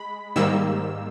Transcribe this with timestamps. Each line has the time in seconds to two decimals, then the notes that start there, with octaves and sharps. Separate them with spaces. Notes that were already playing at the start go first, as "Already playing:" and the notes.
Already playing: G#3 B5
0.36 G#2 D#3 G3 A#3 E6